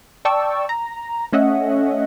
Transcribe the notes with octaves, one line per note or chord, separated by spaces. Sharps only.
D5 G5 A5 C#6 E6
A#5
A3 C#4 D#5 E5 F#5